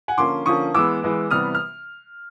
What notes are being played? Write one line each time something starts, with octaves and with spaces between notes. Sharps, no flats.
F#5 G#5
D3 F3 A#3 C#4 C6 D6
D3 F3 A#3 C#4 C#6 D#6
E3 G#3 B3 D6 E6
E3 G#3 B3
C3 E3 G3 B3 D#6 F6
F6